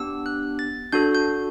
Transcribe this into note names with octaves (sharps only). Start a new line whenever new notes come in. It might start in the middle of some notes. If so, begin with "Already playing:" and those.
Already playing: B3 D4 G4 E6
F#6
A6
D4 F#4 A4 G6
G6